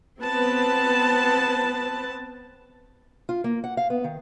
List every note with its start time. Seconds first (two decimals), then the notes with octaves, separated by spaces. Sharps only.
0.21 B3 C4 B4 A5
3.29 F4
3.44 A#3
3.64 F#5
3.77 F5
3.90 B3
4.04 D#3